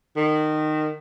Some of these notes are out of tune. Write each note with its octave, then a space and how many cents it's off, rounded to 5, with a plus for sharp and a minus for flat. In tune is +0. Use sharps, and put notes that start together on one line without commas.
D#3 -20